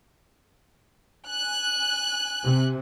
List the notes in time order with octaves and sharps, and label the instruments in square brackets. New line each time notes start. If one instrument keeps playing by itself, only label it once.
[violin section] G#5 F#6
[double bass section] C3